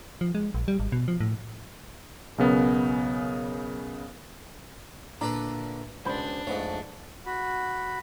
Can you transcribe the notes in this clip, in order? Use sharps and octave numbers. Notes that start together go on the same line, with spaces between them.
F3
G#3
A#1
G3
G#1
B2
F3
A2
B1 C#3 B3 A#4
A#2 D3 D4 E4 A4 B4 A#5
C#2 B2 D4 C5 B5
F2 G#2 A3 D#4 B4 C#5 D5
F#4 B5